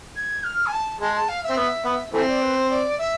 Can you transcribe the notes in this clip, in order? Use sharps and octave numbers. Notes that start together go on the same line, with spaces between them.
G#6
F6
G#5
A5
G#3 A5
A5
F5
E5
C4
B3
B3
E3 A3 C4 E5
D5
B4
C5
D5
E5